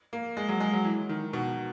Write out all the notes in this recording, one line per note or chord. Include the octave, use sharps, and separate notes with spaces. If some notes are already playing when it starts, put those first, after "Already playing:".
A#3
G#3
F#3
G#3
F#3
E3
D#3
B2